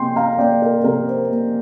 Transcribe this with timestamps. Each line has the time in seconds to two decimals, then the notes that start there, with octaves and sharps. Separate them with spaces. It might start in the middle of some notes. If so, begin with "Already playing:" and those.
Already playing: C3 A#3 G5 C6
0.16 F5 A#5
0.38 A#3 D5 G5
0.62 A#4
0.84 C3 A#4
1.08 C5
1.31 A#3